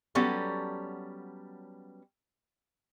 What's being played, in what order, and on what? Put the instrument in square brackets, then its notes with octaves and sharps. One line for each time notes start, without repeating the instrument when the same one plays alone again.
[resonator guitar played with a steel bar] F#3 G3 B3 C#4 A4